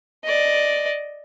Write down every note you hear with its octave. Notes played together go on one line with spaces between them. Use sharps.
D5 D#5